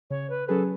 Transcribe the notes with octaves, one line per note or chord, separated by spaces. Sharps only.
C#3 C#5
B4
F#3 C#4 G#4 A4 B4